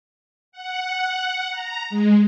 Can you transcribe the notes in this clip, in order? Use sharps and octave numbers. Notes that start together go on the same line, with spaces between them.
F#5
A#5
G#3